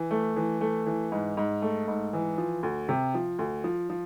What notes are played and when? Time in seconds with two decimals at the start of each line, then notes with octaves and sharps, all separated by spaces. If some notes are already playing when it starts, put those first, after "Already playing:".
Already playing: E3
0.11 A3
0.36 E3
0.61 A3
0.86 E3
1.12 G#2
1.37 G#2
1.62 A3
1.88 G#2
2.13 E3
2.38 F3
2.63 D2
2.89 C3
3.14 F3
3.39 D2
3.64 F3
3.90 F3